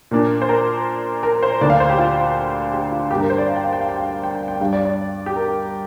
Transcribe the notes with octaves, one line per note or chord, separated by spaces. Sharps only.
A#2 A#3 D4
C5
A#4
A#4
C5
D2 D3 A#3 D4 D5
F5
C5
G4
F4
G4
F4
G2 D3 A#3 D4 G4
A#4
C5
D5
F5
G5
F5
G5
F5
G5
F5
G5
G5
G5
G2 G3 D4 F5
D5
D5
G4
A#4